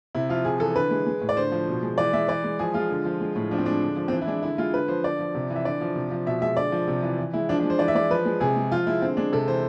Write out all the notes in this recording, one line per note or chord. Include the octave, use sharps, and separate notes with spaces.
C3 E4
F3 F4
C3 G#4
E3 A4
D3 B4
G#3
G#3
A2
D5
D3 C5
F3
B2
G#3
E3 D5
G#3 E5
E3 D5
G#3
F3 G#4
G#3 F4
D3
F3
G#3
A2
F3 D4
C4
G#3 D4
D3
F3
C4
E3 D4
E4
G#3 D4
D3 E4
G#3 F4
D3 B4
F3 C5
D3 D5
F3
C3
E3
E5
D3 D5
F3
C3
F3
B2 E5
G#3 E5
D3 D5
F3
C3
E3
E3
G#3 E4
F3 D4
G#3 D4
C5
E3 D5
E5
G#3 D5
F3 B4
G#3
C3 G#4
G#3
F3 F4
G#3 E4
D3 C4
G#3 D4
C3 A4
E3 C5